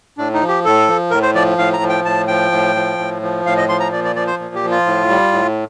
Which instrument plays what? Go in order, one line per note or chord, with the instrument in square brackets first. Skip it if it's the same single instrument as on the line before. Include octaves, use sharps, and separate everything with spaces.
[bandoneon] A2 D4
D#4
F3
G4
A2 A4
F3
A2 A#4
C5
F3 D5
A2 F5
A#5
F3
G5
A2 A5
F3 G5
A2
F3
A2
F3
A2 F5
D#5
F3 C6
A#5
A#2 D5
D5
F3 D5
C5
A#2
G4
F3
F4
A2
G3
A2